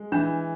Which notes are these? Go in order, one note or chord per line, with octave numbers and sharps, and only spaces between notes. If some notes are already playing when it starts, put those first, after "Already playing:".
Already playing: G#3
E3 D4